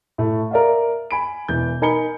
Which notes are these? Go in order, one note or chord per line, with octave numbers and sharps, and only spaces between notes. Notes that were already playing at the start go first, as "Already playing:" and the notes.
A2 A3
A#4 D5 E5 F5
G#5 B5 D7
E1 E3 G6
D#4 A#4 G#5 B5 C#7 G7